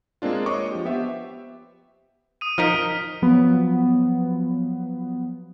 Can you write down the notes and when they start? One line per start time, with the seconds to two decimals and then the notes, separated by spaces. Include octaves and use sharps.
0.22 G#3 A#3 C4 D4 F4
0.46 C#5 D#5 C#6 D6
0.72 F3 G4
0.85 B3 G4 C5 E5
2.41 D#6 D#7
2.58 F3 D#4 A#4 F6 B6 D7
3.22 F3 F#3 B3